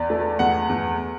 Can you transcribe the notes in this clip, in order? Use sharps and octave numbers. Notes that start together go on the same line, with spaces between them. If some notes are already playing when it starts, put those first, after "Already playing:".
Already playing: E2 D5
A3
E2 F#5
E2